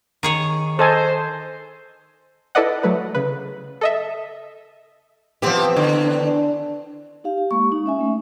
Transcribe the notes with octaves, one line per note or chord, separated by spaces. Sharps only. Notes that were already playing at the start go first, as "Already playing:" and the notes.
D#3 G#4 C#5
A4 C5 D#5 G#5
E4 A4 B4 D5 D#5 F#5
F#3 A3 B4
C#3 B4
A4 D#5 E5
E3 F3 B3 C4 G4
D3
D4
D#4 G4 F5
G4
G#3 A#3 C#6
D#4
C#4 E5 G#5
A3 C#4